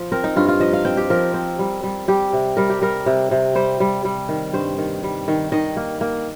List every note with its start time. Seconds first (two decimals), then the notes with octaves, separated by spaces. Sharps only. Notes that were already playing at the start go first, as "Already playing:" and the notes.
Already playing: F3
0.12 C4 A#4
0.24 D#4
0.36 G2 F4
0.48 F4
0.60 F3 D#5
0.73 F5
0.85 C4 G5
0.97 G4
1.10 F3 A#4
1.34 C4
1.59 G3
1.84 G3
2.08 G3 G4
2.33 C3
2.57 G3 A#4
2.70 G4
2.82 G3 A#4
3.06 C3
3.31 C3
3.55 G3 C5
3.80 G3
4.05 G3
4.29 D#3
4.53 G2 C5
4.78 D#3
5.03 G3
5.28 D#3
5.52 D#3 D#5
5.77 A#3
6.01 A#3